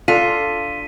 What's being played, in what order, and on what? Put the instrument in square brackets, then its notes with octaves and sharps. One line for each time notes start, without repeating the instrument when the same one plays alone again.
[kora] D4 A4 [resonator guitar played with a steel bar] F4 [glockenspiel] B6 D#7